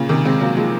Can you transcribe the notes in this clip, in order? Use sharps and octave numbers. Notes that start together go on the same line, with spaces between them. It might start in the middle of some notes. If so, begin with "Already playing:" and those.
Already playing: A#2 C#3
C3 D#3
G#3 C4
F#3 A#3
F3 G#3